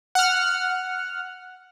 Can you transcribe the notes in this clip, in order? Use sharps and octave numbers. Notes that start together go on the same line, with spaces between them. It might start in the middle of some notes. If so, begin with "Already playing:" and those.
F#5 F6